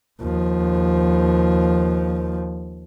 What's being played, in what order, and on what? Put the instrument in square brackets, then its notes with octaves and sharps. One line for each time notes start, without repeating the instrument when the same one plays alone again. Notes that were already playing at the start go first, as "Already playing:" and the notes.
[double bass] D#2 F3